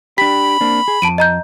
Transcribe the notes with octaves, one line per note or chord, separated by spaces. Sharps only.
D4 G4 B5 B6
A#3 C4 D4
G#4
F2 A5 D7 D#7
D#5 A#5 G6